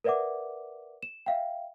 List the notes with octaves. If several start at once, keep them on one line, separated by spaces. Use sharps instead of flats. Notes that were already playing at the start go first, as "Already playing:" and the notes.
A#4 B4 D5 E5 F#5 D6
E7
E5 F5 G5